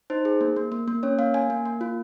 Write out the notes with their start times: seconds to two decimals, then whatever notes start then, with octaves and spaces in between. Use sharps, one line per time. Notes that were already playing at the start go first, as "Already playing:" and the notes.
0.10 D#4 C5
0.25 G#4
0.41 A#3
0.56 A#3
0.72 A#3
0.88 A#3
1.03 C#4 C#5
1.19 A#3 F5
1.34 A#3 G#5
1.50 A#3
1.65 A#3
1.81 F4